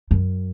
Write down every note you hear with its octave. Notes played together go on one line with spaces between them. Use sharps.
F#2